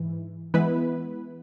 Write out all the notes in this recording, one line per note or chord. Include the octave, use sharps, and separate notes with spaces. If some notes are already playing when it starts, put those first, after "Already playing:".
Already playing: G#2 E3
E3 G#3 B3 E4 B4